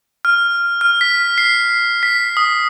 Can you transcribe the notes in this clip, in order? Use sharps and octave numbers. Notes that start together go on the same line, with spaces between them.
F6
F6
B6
C7
B6
D#6